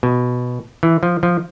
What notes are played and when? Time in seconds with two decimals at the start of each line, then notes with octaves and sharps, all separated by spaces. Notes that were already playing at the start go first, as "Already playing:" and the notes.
0.03 B2
0.83 E3
1.03 F3
1.23 F3